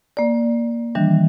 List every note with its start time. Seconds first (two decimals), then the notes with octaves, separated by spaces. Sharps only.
0.17 A#3 D5
0.95 D#3 E3 G3 D4